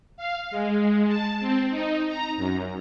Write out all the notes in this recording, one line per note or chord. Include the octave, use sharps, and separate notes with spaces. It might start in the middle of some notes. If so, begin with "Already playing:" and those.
F5
G#3
A5
C4
D#4
A#5
F#2